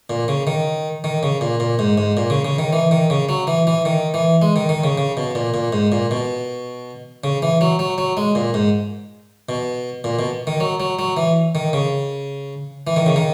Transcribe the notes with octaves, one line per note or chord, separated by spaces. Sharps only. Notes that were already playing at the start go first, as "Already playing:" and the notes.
A#2
C#3
D#3
D#3
C#3
A#2
A#2
G#2
G#2
A#2
C#3
C#3
D#3
E3
D#3
C#3
F#3
E3
E3
D#3
E3
G#3
D#3
D#3
C#3
C#3
B2
A#2
A#2
G#2
A#2
B2
C#3
E3
F#3
F#3
F#3
G#3
A#2
G#2
B2
A#2
B2
D#3
F#3
F#3
F#3
E3
D#3
C#3
E3
D#3
C#3
D#3